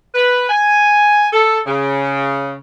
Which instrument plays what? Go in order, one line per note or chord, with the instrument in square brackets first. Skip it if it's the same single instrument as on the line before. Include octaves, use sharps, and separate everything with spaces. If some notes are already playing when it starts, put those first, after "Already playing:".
[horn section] B4
G#5
A4
C#3